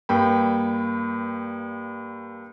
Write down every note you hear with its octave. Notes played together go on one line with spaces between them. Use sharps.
G2 A#3 G5 B5